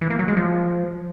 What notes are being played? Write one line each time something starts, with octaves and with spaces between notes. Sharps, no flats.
E3
A#3
F#3
G#3
F3